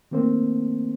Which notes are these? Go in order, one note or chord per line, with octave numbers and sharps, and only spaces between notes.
D#3 A3 A#3 C4 C5